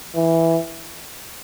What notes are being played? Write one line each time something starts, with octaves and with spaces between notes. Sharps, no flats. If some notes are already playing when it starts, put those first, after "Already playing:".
E3